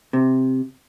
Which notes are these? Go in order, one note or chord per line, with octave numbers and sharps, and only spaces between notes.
C3